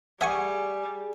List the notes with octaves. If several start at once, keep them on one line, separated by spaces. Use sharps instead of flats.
G3 A3 G#4 E5 F#5 G#5 C#6